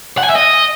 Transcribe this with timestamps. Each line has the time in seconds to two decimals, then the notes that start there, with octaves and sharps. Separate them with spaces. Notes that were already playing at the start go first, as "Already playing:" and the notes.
0.18 F#5
0.24 G#5
0.29 E5
0.35 D#5